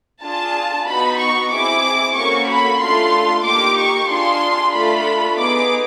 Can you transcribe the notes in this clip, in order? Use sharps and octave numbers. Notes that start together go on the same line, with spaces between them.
D4 F4 G#4 A5
B3 D#4 F#4 B5
C#6
C4 E4 G#4 D6
A#3 C#4 F#4 A4 C#6
B5
A3 D4 F4 A4 C6
A#3 D#4 G4 D6
C#6
D4 F4 G#4 C6
A3 D4 F4 A4 B5
B3 D#4 G#4 D6